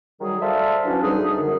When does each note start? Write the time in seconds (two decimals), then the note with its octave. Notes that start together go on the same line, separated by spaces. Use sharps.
0.21 D#3 F#3 G3 G#4
0.41 A4 C5 D5 E5 F5
0.86 E3 F#3 C#4 D4
1.03 D2 B2 G3 D#4 G#4
1.38 F#2 D3